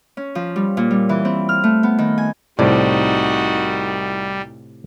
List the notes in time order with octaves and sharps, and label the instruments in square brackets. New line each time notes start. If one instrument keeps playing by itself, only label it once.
[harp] C#4
F3
G3
A#2
G3
E3
C4
F6
A3
B3
D#3
G#5
[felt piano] C2 C4 D5 [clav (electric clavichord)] A2 C3 [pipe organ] G3 [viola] D#4 F#4